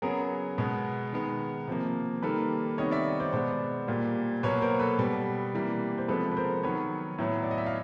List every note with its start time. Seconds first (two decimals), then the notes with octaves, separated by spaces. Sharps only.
0.02 C#3 F#3 B3 G#4 A#4
0.58 B2 G#3 B3
1.13 D#3 G#3 B3
1.67 C3 F3 A#3
2.23 D#3 G3 A#3 A4 B4
2.78 C3 D#3 G3 B3 C#5 D#5
2.91 D5 E5
3.20 C5 D5
3.33 B2 G#3 B3 C5 D5
3.88 A#2 G3 A#3
4.43 B2 F#3 A#3 B4 C#5
4.62 A#4 C5
4.80 A4 B4
4.99 B2 G3 B3
5.53 C3 E3 G3 A#3
5.98 C5
6.08 C3 F3 G#3 B3 A4 B4
6.32 B4
6.37 A#4 C5
6.63 D#3 F#3 B3 B4 C#5
7.18 A2 F#3 B3
7.43 D5
7.51 D#5
7.58 E5
7.66 F5